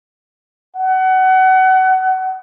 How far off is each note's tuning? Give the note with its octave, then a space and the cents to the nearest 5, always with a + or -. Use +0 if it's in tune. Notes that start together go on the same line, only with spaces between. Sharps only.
F#5 +25